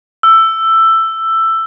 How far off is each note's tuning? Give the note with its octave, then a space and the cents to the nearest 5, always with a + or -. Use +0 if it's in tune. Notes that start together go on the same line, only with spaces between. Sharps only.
E6 +10